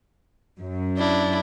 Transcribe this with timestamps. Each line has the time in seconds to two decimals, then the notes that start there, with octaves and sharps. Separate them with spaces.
0.61 F#2
0.99 D4 E4